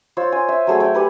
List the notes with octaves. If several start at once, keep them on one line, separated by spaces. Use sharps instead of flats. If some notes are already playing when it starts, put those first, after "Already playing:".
F4 C5 C#5 E6
G#5
E5
F#3 A3 G#4 C#5
C#5 G5
G4 B4 G#5